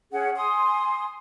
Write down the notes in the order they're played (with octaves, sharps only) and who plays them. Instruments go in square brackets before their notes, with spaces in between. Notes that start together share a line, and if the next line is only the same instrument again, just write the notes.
[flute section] C#4 G#4 F#5
G#5 C6 D#6